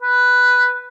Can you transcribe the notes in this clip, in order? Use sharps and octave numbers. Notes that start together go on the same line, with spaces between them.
B4